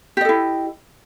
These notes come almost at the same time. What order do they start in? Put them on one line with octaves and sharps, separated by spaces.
G4 D#5 A4 E4